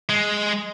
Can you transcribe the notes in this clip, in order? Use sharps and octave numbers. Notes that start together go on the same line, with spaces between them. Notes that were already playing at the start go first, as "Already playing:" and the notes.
G#3